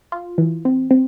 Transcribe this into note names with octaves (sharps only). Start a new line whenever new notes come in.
F4
E3
C4
C4